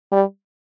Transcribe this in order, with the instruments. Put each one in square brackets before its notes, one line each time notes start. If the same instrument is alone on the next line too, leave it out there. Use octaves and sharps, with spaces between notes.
[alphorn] G3